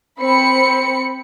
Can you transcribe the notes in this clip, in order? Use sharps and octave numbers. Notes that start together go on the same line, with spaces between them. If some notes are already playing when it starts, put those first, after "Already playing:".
C4 B5 C#7